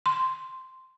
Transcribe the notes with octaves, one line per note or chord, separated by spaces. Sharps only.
C6